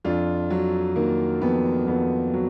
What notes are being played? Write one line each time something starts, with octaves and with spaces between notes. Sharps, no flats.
F2 D4 F4
F#3
D#3 A#3
F2 B3
F2 B3
F#3